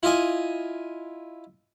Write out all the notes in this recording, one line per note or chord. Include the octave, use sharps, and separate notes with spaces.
E4 F4 D#5 G#5